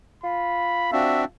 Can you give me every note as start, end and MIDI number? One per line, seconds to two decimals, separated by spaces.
0.24 1.30 65
0.24 0.89 83
0.92 1.25 60
0.92 1.25 62
0.92 1.25 66
0.92 1.23 76